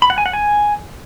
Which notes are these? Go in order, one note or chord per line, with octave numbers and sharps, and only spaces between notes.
B5
F#5
G#5
F#5
G#5